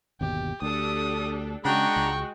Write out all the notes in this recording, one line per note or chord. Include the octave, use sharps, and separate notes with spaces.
G1 D#2 B2 G4
D2 D4 G4 A4 D#6
C#3 G#3 D4 F#4 F#5 G5 A#5 C#6
C#2